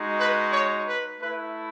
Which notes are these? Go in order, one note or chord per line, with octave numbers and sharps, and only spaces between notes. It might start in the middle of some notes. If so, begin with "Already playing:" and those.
Already playing: G#3 D#4 F#4
B4
C#5
B4
A3 E4 B4